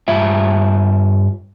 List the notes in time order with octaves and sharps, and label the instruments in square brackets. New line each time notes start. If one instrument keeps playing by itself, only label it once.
[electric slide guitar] G2 F4 E5